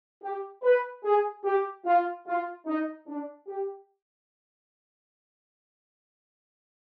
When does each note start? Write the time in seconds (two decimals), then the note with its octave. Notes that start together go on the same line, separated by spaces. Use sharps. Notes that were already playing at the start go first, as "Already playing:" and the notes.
0.22 G4
0.62 B4
1.03 G#4
1.44 G4
1.85 F4
2.26 F4
2.66 D#4
3.07 D4
3.47 G4